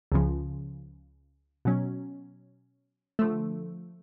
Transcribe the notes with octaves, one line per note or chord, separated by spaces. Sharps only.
C#2 C#3 F3
B2 F#3 C#4
D3 F3 A3